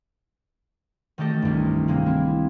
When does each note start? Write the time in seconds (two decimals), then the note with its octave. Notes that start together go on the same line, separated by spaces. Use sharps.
1.18 D#3 A3 F#4 G4 A4 D#5
1.42 C2 G2
1.87 C3 G#3 A#3 C4
2.06 E4